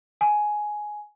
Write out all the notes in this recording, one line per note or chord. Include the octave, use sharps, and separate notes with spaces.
G#5